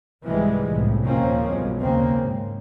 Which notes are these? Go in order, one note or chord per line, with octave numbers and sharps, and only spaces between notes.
C2 G#2 E3 F3 G3 G#3
G1 C2 A2
D#2 A#2 F3 A#3 C4 C#4
B1 G2 G#3
D#2 C#3 A#3 C4
G#2